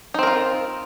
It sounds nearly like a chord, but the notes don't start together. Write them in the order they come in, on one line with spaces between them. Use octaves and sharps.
D#4 C4 A#4 F4